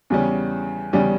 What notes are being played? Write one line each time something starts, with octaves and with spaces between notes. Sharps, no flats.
E2 C#3 G3 C#4
E2 C#3 G3 C#4